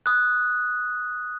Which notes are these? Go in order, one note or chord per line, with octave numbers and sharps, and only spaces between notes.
D#6 F#6